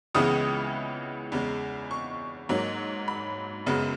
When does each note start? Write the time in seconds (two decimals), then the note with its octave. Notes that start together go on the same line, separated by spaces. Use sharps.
0.15 C#2 C#3 E3 G#3 B3 D#6
1.32 E2 C#3 G#3
1.91 C#6
2.49 G#2 F#3 A#3
3.08 B5
3.66 F#2 C#3 G#3 B3